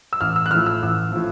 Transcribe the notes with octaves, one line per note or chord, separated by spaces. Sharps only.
E6
A1 F6
E6
F#6
A2 F3 F6
E6
A1
A2 F3